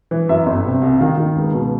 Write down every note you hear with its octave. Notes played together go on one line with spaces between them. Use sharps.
E3
F#2 E5
G1
C3
C2
D#3 F5
D#3
C#2
B2